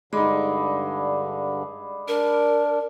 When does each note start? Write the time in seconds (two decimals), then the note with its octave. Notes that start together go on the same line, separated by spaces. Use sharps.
0.13 G2 D3 G#3 D#4 D5 B5 D6
2.08 D4 A#4